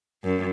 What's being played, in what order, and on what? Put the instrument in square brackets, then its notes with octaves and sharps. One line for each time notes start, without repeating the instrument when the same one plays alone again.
[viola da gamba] F#2